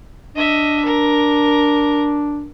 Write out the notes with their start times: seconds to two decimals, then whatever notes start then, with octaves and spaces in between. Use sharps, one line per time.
0.36 D4 D#5 E5
0.85 A#4